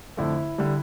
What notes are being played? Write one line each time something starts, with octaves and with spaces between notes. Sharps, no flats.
F2 D3 A3 E4
D3 G3